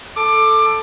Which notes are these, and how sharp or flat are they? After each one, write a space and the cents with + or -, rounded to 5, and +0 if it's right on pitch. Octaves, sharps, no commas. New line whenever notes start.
A4 +0 D6 +20